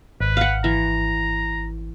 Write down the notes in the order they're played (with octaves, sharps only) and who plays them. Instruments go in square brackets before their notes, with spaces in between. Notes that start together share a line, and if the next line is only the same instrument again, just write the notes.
[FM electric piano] G#1 [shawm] B4
[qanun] F5 F#5
[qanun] E3 [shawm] A#5